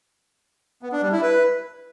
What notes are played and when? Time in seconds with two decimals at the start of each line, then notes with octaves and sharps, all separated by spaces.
0.82 B3
0.92 D4
1.02 G3
1.12 E4
1.22 B4